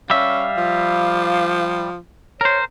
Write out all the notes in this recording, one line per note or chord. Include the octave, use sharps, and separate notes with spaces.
G3 C#4 E5 F5
F3
A#4 C5 C#5